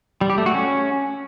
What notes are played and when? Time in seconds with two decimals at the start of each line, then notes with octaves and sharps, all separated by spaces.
0.21 G3
0.30 G4
0.38 A3
0.46 F#4
0.54 C#4